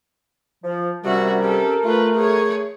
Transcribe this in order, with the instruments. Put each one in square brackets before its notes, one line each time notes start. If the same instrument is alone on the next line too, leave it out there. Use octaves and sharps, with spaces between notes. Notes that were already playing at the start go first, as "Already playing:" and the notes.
[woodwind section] F3
[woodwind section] C3 G3 C#4 [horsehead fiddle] F#4 E5 [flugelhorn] A#4
[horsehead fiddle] G4 A4
[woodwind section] A3 [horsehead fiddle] F4 B4
[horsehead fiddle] G#4 C#5